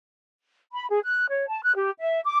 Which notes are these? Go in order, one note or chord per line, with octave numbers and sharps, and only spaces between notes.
B5
G#4
F#6
C#5
A5
F#6
G4
E5
D6